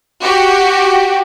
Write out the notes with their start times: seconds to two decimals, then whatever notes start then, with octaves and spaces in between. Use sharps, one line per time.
0.22 F#4 G4